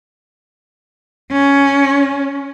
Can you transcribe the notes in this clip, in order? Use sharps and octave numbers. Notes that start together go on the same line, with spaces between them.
C#4